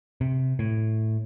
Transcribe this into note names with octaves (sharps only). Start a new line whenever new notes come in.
C3
A2